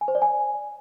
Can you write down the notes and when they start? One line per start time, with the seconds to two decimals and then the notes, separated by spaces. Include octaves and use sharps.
0.01 G#5
0.08 C5
0.15 D5
0.22 G#5